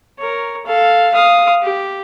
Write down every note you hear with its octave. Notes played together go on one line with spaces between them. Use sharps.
A#4 C#5
A4 F5
F5 D#6
G4